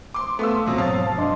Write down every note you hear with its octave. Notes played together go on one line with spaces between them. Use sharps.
C6 D6
A3 B3 A4 F5 C6 E6
F2 B2 F#3 D#6
G#2 F5 A5 A6
F3
F#2 D4 D#5 C6